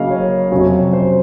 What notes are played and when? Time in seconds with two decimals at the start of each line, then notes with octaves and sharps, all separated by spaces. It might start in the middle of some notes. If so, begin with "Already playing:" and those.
Already playing: C#3 F#3 A#3 C#4 D#5 F5
0.10 C#5
0.52 F2 C3 F#3 C#4
0.93 C5